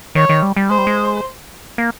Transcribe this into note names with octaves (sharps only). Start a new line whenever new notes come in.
D#3 C#5
D#3
G3
G3
G#3 C5
G3
G#3
A#3